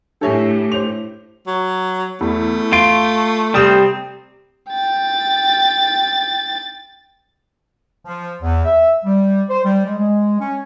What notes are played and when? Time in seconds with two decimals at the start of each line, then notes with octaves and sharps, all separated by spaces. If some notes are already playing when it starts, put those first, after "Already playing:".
0.21 A2 D4 G4 A4 C#5 E5 G#5
0.72 C5 C#5 D6 F7
1.47 F#3
2.21 E2 A3
2.73 F4 D7
3.54 C3 G3 C4 D#6 E7
4.71 G5 A6
8.05 F3
8.42 E2
8.65 E5
9.04 G3
9.50 C5
9.65 G3
9.86 G#3
9.98 G#3
10.40 C#4